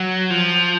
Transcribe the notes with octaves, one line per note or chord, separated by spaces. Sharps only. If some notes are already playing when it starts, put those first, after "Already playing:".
Already playing: F#3
F3